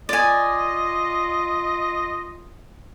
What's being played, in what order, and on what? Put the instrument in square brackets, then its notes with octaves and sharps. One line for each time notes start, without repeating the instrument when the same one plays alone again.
[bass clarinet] F4 [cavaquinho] D5 G#5 [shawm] D#5